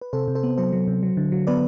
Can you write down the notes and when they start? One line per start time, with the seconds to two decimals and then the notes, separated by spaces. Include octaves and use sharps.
0.01 B4
0.13 C3 A4 C5
0.28 C3
0.35 A4 C5
0.43 B3
0.58 F#3 A4 C5
0.73 F#3
0.87 C3
1.03 F#3
1.17 D3
1.32 F#3
1.47 B3 B4 D5